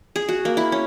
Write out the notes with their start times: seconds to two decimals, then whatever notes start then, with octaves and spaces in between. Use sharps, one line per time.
0.16 G#4
0.29 F#4
0.45 A#3
0.57 E4
0.72 C#4